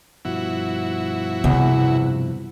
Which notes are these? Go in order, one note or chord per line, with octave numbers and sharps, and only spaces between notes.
G2 B2 F3 E4 F#4
E2 C3